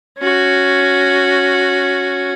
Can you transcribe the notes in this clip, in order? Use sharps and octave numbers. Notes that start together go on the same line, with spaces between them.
C#4 F#4